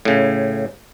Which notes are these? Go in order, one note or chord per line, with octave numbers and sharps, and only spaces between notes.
A2 C#3